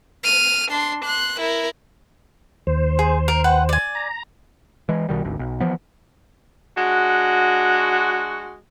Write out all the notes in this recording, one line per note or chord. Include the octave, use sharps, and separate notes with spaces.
F6 D#7
D4 C6
C6 F#6
E4 A#4
D#2 C5
G#4
A#4
B4 F#5 G5
D5 G#5
A#5
E3 G#3
B1 B2 D#3 G3
G#1 D2
B1
E3 F3 B3
G#3 D4 F#4